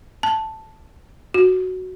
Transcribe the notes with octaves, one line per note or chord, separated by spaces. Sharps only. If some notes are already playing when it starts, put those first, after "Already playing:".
A5
F#4